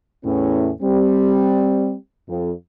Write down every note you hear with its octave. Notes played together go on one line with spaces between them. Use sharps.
E2 A2 C#4
G3 C4
F2